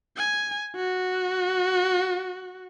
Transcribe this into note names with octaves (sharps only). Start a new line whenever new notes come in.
G#5
F#4